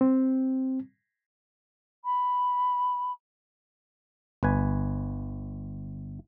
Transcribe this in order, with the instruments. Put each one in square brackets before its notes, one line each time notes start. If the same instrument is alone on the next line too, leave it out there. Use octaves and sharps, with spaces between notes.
[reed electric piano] C4
[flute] B5
[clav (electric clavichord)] G1 B4 G#5